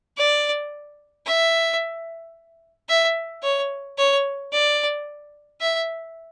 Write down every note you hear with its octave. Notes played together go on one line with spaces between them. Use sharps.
D5
E5
E5
C#5
C#5
D5
E5